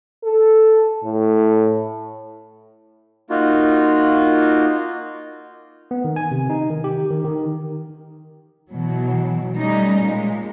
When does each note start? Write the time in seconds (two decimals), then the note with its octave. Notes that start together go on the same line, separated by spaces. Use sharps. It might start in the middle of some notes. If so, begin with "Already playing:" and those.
0.24 A4
1.04 A2
3.30 A#3 D#4 F4 F#4
5.91 B3
6.04 D#3
6.16 G#5
6.31 C3
6.50 D#4
6.70 D#3
6.84 G4
7.10 D#3
7.24 D#3
8.70 B2 E3 F#3
9.54 G3 A3 C#4 D#4
10.01 A#2 G#3